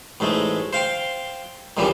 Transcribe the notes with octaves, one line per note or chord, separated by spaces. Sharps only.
A1 G#2 G#3 A3
C5 F5 G5 C6
C#2 A#2 D3 E3 F3 G3